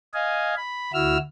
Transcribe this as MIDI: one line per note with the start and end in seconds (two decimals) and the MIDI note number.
0.14 0.55 75
0.14 0.55 77
0.14 0.55 80
0.57 0.92 83
0.93 1.17 38
0.93 1.17 64
0.93 1.17 66
0.93 1.17 88
0.93 1.17 89